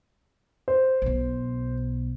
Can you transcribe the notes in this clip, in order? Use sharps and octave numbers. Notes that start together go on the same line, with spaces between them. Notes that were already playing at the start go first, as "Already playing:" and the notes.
C5
B1 B2